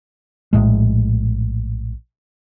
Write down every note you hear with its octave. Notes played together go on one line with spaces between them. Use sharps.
A#1 D#2 A2 G#3